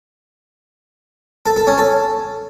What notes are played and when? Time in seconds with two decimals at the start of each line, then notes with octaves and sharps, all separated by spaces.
1.46 A4
1.56 A4
1.67 C#4
1.78 A4